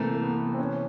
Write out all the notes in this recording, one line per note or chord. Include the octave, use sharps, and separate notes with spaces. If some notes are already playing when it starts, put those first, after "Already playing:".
Already playing: C3 E3 A3 A#3
A#3
B3
C4
C#4